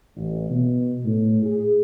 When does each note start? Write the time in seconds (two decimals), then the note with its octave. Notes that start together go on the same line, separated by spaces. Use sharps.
0.16 A1
0.50 B2
1.05 A2
1.43 G#4